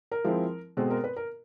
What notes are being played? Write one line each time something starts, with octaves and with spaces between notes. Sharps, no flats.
A#4
F3 G#3 C4 E4
B2 G#3 C4 A4
A#4
B4
A#4